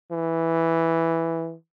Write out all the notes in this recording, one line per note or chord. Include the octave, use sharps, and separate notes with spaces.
E3